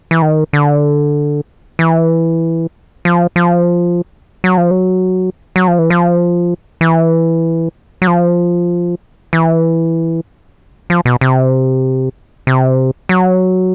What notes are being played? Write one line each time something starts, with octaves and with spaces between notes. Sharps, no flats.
E3
D#3
D3
E3
F3
F3
F#3
F3
F#3
F#3
F3
E3
F3
E3
F#3
F3
E3
F3
B2
C3
C3
F#3